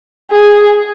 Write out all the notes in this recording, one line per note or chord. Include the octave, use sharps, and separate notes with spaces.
G#4